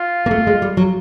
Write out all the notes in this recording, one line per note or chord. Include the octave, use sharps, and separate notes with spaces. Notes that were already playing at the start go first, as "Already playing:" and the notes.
Already playing: F4
A#3
A3
G#3
G3
F#3